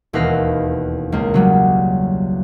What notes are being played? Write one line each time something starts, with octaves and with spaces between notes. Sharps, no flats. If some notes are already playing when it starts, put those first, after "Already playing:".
E1 D#2 C4 B4 F5 A#6
C#2 A#3
C#3 F#3 G3